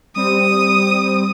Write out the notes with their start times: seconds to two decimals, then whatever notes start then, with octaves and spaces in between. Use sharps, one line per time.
0.16 G3 C4 D#6